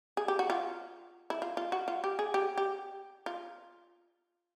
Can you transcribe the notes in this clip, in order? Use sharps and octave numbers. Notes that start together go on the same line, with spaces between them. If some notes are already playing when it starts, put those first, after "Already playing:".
G#4
G4
F#4
F4
E4
F4
F4
F#4
F4
G4
G#4
G4
G4
F4